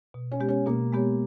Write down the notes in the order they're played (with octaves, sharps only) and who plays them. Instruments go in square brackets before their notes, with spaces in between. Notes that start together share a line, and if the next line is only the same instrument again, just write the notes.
[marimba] B2
[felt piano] C#4
[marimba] G#3 B3 G4 C#5
[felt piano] C#4
[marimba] B2 [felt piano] A#3
[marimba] G#3 B3 G4 C#5